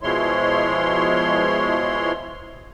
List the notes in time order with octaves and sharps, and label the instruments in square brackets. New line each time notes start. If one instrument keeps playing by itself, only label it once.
[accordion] B2 F3 G#3 E4 C#5 C6